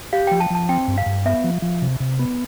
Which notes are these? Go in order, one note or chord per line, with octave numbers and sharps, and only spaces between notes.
G4 F5
G5
F3
A5
F3 A5
C4 G5
G2
F5
G2
B3 E5
F3
F3
C3
C3
B3